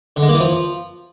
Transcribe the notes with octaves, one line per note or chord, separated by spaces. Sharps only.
D3
G#3
A#3
E3
F3